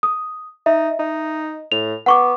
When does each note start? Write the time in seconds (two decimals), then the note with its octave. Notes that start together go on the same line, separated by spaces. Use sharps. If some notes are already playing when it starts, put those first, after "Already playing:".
0.03 D#6
0.66 D#4 E5
0.99 D#4
1.72 A2 F7
2.06 B3 F#5 C#6 D6